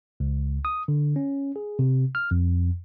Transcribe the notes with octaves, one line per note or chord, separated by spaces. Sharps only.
C#2
D#6
D3
C#4
G#4
C3
F6
F2